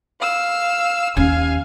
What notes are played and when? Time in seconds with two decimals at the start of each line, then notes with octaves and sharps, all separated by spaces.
0.21 F5 E6
1.17 D#2 C#4 F5 G#5